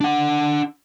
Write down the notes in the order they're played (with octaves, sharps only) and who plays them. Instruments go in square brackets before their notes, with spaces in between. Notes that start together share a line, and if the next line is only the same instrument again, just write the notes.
[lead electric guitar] D4 F#5